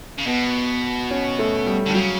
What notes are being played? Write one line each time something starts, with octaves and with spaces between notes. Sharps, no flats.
C#3
B2 B3
C#4
A3
G3
D3
G3
C#3 F#3